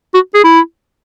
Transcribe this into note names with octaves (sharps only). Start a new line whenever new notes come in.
F#4
G#4
E4